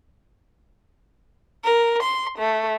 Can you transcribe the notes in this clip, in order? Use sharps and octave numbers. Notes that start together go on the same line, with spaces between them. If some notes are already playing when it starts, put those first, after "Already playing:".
A#4
C6
A3